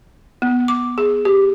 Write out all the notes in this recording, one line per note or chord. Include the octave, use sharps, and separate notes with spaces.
B3
D6
G#4
G4